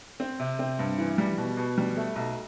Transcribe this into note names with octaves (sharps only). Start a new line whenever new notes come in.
C4
C3
C4
G2
E3
G3
B2
B2
G3
A3
B1